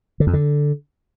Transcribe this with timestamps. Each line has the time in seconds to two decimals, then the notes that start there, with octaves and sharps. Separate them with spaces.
0.20 D3
0.27 F2
0.34 D3